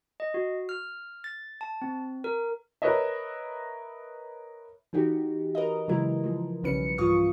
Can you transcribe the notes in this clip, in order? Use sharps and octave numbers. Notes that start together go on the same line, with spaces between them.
D#5
F#4
F6
A6
A5
C4
A#4
A#4 B4 C#5 D#5 E5
E3 D#4 F#4 G4
A#4 B4 D#5
C#3 E3 F#3 G#3 E4 A#4
F3 G#3
B1 C#3 G3 C#4 B4 C#7
G2 E3 F4 F5 C#6 D#6